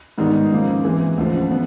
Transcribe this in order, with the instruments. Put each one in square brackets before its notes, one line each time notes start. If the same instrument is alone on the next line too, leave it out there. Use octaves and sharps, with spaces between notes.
[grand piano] G#2 D#3 G3 B3 D#4
C#3 F3 A#3
E3 G#3 C4
D2 C#3 F3
B3